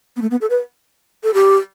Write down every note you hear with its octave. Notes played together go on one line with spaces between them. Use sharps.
B3
A3
B3
A4
B4
A4
G4